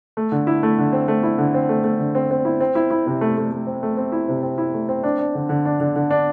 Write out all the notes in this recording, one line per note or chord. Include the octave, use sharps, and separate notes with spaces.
A3
D3
E4
A3
D3
C4
A3
E4
D3
C4
A3
A3
D3
C4
C4
E4
C4
E4
E4
C3
A3
A3
A3
C4
A3
C4
E4
C3
C4
E4
A3
C4
D4
D4
D3
D3
D4
D3
D3
D4